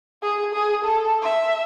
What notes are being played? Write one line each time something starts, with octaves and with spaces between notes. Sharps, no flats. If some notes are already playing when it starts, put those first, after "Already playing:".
G#4
G#4
A4
E5